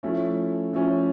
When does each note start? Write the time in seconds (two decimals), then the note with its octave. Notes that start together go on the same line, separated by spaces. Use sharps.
0.03 F3 A3 C#4 E4
0.73 F3 A3 C#4 E4